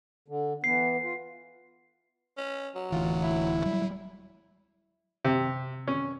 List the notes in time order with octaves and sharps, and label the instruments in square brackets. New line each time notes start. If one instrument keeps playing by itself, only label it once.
[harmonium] D3
[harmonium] E3 B3 [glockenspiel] C7
[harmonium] F4
[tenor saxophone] C#4
F#3
[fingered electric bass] D1 D2 E3 [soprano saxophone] F4
[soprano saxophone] E4
[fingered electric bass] F#3 G3
[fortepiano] C3
C#4